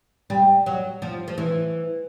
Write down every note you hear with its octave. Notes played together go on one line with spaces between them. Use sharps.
G3
F#3
F3
F3
E3